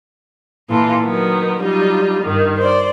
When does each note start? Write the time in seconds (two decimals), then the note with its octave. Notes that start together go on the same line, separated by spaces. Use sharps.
0.69 A#2 E3 F4 A4
1.04 D#3 F#3 B3 A#4
1.61 F#3 G3 D#4 F4
2.24 G2 D#3
2.58 C5 D5